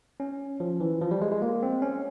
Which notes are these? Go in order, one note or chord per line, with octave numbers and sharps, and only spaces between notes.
C#4
F3
E3
F3
G3
G#3
G#3
A#3
C4
C#4